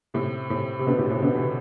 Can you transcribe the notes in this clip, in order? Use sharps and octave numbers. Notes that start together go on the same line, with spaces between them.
A2 C3
A2 C3
C3
B2 D3
A2 C3
A2 C3
B2 D3
C3 E3